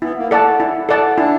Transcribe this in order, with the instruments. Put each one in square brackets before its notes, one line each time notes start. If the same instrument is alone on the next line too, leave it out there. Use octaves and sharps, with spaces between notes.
[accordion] B3 [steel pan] E4
[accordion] A#3
[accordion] A3 [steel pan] A4 D5 F#5 A5
[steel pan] E4
A4 D5 F#5 A5
[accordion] D4 [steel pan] E4